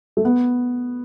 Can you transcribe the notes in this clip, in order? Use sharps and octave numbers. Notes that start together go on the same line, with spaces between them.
A3
B3